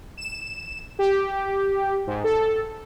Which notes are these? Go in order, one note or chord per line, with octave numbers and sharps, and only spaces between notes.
E7
G4
G#2
A4